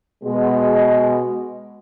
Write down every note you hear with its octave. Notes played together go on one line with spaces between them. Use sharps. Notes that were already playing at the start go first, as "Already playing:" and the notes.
B2 G#3